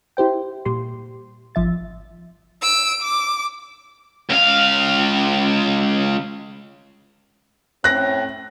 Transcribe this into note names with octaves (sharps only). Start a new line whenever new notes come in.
E4 G4 C5 G5
A#2 G3 C6
G#1 F3 E5 A6
E6 D7
D6
C#2 F5
A2 C4 C#4 F#6 A#6